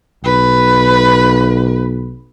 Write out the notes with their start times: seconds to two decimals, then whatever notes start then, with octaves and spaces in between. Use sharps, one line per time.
0.25 B1 B4